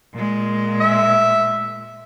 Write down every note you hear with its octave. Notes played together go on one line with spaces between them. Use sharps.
A#2 G#3
E5